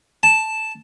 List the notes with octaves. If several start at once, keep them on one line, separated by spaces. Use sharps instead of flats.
A5